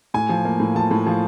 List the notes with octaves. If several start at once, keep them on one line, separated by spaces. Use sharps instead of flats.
A2 G#5
F3
A#3
A2
F3 A5
A2
F3